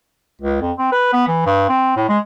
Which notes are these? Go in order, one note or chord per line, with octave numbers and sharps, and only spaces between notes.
C#2
F2
C4
B4
B3
E3
G2
C4
A2
G#3